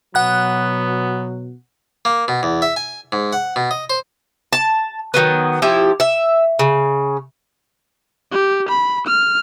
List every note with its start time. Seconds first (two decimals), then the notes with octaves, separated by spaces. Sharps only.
0.15 B2 F#3 B3 F#5 F#6
2.05 A#3
2.28 B2
2.43 E2
2.62 E5
2.76 G#5
3.12 G#2
3.33 F#5
3.56 B2
3.71 D#5
3.90 C5
4.53 A5
5.14 D#3 F#3 B3
5.62 F3 E4 G4
6.00 E5
6.59 C#3
8.32 G4
8.69 B5
9.07 F6